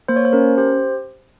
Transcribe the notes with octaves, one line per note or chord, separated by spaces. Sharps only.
A#3 C5
C#5
C5
C#4 A#4
G4 C5